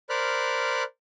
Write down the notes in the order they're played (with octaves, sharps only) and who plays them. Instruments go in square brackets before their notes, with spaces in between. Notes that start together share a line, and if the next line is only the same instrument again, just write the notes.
[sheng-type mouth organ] A#4 C5 D5 B5 F6 F#6